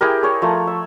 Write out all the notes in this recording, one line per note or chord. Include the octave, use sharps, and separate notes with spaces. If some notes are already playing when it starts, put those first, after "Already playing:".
E4 G4 G#4 A#4
G#4 C#5
F3 A3 A#5
E5